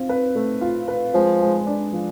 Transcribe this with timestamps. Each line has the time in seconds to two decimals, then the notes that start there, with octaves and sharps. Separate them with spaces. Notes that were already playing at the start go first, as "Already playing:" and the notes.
Already playing: C4 F4
0.09 B4
0.35 A3
0.61 F4
0.88 B4
1.14 F3 G#3
1.41 G#3
1.66 D4
1.93 F3